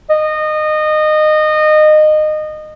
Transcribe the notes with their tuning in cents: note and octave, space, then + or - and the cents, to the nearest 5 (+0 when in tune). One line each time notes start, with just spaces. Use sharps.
D#5 -20